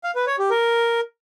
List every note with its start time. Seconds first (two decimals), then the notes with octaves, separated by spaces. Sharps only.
0.04 F5
0.15 B4
0.27 C#5
0.39 G4
0.50 A#4